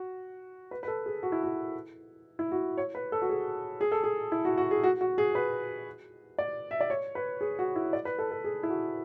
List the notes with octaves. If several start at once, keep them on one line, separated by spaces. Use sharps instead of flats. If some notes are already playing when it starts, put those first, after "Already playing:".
Already playing: F#4
B4
B4
A4
G#4
F#4
E4
F#4
E4
F#4
C#5
B4
A4
F#4
G#4
G#4
A4
G#4
E4
F#4
F#4
G#4
F#4
F#4
G#4
B4
D5
E5
D5
C#5
B4
G#4
F#4
E4
D5
B4
A4
A4
G#4
E4
F#4